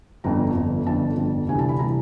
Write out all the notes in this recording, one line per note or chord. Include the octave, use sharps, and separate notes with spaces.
G1 F2 D3 A#5
G1 F2 D3
G1 F2 D3 A5
G1 F2 D3
D2 C3 E3 G3 G#5
A5
B5
C3 E3 G3 A#5